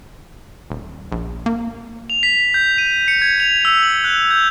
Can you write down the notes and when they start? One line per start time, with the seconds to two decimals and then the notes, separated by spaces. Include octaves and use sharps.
0.70 D#1
1.12 A#1
1.46 A#3
2.10 F7
2.23 B6
2.54 G6
2.78 D#7
3.08 C#7
3.22 G#6
3.40 F7
3.65 E6
3.83 F#7
4.04 F#6
4.31 G6